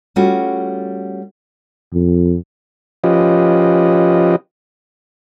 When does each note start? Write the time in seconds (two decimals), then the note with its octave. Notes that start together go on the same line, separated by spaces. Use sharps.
0.16 G3 A3 C#4 F4 F#4
1.93 F2
3.04 F3 C#4 F4 G4 B4 D#5